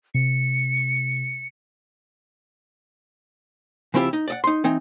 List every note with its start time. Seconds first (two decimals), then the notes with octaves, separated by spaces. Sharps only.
0.15 C3 C#7
3.94 C#3 F3 C4 E4 F4 G4
4.13 D#4
4.28 D5 D#5 F#5
4.44 D#4 C6
4.64 E3 C4 D#4